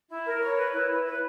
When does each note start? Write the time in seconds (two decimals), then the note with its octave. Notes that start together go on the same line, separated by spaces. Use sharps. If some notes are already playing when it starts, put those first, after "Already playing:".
0.08 E4
0.25 A#4
0.40 C#5
0.57 B4
0.73 E4
0.90 E4
1.05 B4